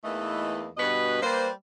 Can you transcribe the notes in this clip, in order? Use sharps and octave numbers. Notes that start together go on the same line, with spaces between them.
E2 E3 A3 A#3 D#4 D#5
G2 B2 F#4 B4 D#5
G3 A#3 B4 C5